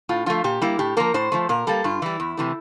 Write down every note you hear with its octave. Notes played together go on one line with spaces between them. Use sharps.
A2 F4
F3 A3 F4
A#2 G4
G3 A#3 E4
A2 G4
F3 A#3 A#4
A2 C5
F3 A3
A#2 A#4
G3 A#3 A4
G2 F4
E3 G3 E4
E2
C3 E3 A3